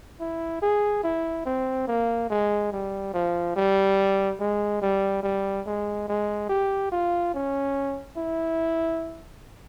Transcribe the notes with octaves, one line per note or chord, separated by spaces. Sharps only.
E4
G#4
E4
C4
A#3
G#3
G3
F3
G3
G#3
G3
G3
G#3
G#3
G4
F4
C#4
E4